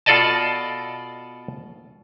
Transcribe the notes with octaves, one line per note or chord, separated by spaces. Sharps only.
B2 F4 A4 D5 D#5 A5